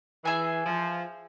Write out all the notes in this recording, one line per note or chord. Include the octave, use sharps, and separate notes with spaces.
E3 G#4 E5 G#5
F3